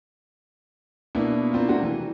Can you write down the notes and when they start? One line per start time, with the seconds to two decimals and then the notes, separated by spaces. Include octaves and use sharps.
1.15 B2 A#3 B3 D4 E4
1.52 A#3 C4 D4 F4
1.69 C3 A3 A#3 D4 F#4 G4
1.83 E3